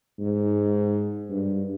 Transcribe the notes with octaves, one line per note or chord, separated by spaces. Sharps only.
G#2
G2